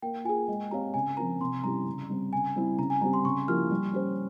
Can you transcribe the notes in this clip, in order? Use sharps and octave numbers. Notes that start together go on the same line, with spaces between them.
A#3 G5
F4 G#4 G#5
G#3
C4 G4 C#5 F5 A#5
C#3 G#5
F3 C4 F4 A#4 A#5
C3 C6
G3 C#4 E4 G4 A#5
C#3
G3 C4
C#3 G#5
G3 C4 E4
C#3 A#5
G#5
G3 C4 G4 A#5
C6
C#3 C#6
F3 A#3 E4 G4 F6
G3
C#4 G4 C5